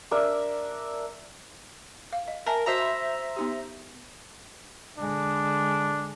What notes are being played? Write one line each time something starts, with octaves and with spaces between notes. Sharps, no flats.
D4 A#4 E5
F5
D#5
A#4 E5 G#5 A5
F#4 C5 D#5 E5 A#5
B5
B3 D#4 G4
D3 G#3 D4